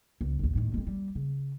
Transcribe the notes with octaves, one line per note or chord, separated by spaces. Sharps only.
C#2
A#1 D#2
A2 D#3
G#3 C4
G3
C#3